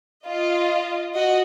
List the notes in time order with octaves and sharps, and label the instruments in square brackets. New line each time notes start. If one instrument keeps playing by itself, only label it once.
[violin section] F4 D#5
F#4 D#5